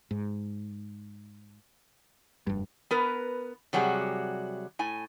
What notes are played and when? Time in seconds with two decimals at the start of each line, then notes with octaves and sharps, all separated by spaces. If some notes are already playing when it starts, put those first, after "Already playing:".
0.11 G#2
2.47 F1 G2
2.91 B3 A#4 B4
3.73 C3 F#3 G3 F#4 G#4
4.79 A2 G#5